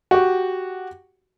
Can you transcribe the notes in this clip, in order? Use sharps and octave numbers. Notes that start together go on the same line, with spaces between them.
F#4 G4